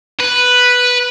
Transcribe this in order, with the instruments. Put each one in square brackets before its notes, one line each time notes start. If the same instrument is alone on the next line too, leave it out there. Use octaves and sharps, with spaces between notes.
[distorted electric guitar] B4